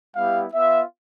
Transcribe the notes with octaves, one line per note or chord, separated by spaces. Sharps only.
G3 B3 E4 G4 F5
B3 F4 E5